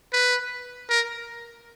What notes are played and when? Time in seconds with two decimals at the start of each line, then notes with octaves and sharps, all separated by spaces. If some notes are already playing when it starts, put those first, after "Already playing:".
0.13 B4
0.90 A#4